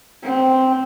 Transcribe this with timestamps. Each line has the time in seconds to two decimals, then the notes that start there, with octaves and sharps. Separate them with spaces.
0.23 C4